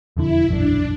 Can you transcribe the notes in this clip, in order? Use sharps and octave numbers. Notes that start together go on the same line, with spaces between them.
E1 F2 D3 E4
E1 A#1 F#2 D4